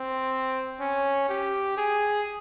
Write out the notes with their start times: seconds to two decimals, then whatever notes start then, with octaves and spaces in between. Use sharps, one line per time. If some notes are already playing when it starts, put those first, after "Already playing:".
Already playing: C4
0.80 C#4
1.29 G4
1.77 G#4